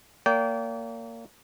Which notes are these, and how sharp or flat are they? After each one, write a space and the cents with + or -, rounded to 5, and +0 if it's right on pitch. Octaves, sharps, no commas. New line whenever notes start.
A#3 -20 D5 -40 G5 -20